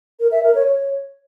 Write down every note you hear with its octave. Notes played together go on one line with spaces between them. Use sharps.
A#4
E5
A#4
C#5
C#5